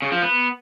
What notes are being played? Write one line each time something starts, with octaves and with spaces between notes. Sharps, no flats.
C#3
F3
B3